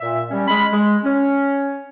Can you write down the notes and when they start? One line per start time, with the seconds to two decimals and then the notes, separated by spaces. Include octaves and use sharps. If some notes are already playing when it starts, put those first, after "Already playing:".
0.01 A#2 E5
0.31 G3 C#4
0.48 G#3 C#4 B5
0.71 G#3
1.04 C#4